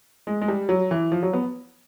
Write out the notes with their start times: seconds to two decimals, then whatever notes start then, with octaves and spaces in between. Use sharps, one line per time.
0.27 G#3
0.41 G#3
0.48 G3
0.69 F#3
0.91 E3
1.12 F3
1.23 F#3
1.33 B3